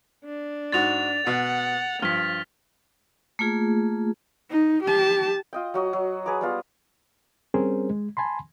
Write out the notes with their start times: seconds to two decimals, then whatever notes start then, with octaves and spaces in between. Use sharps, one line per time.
0.25 D4
0.72 G#2 F#4 A6 F7
1.26 B2 F#5
2.02 G2 F3 F6 B6
3.39 A3 A#3 F4 G#4
4.50 D#4
4.83 G4 A5
5.53 F4 D#5 G5
5.74 F#3 F#4 D#5
5.93 F#3
6.26 G#4 B4 A#5 D6
6.41 G3 B3 F4
7.54 G3 C4 C#4 G#4 A#4 C5
7.90 G#3
8.17 G#5 A5 B5 C6